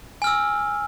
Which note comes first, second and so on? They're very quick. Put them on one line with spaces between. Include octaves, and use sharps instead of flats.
G#5 F6 E6